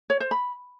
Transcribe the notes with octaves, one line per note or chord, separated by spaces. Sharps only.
C#5
C5
B5